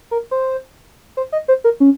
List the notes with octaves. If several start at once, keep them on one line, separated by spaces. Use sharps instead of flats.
A#4
C5
C5
D#5
C5
A#4
C#4